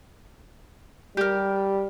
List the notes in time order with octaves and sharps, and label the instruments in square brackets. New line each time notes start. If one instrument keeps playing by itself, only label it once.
[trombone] G3 [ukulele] G4 A#4